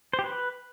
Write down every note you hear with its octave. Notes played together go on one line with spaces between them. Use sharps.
C5
G4
B4